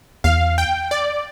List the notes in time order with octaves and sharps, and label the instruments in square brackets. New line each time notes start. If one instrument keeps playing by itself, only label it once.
[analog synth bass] E2 [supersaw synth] F5
[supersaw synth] G5
D5